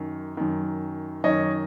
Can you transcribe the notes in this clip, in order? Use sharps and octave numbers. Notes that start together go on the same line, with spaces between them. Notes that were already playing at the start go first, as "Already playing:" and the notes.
Already playing: F#2 D#3
F#2 D#3
F#2 D#3 C#5 D#5